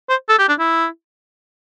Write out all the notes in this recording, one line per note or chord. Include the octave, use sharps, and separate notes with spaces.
C5
A4
G4
D4
E4